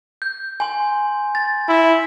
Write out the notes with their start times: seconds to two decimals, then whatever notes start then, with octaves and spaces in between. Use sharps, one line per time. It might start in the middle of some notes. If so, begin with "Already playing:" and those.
0.22 G6
0.60 G#5 C6
1.35 A6
1.68 E4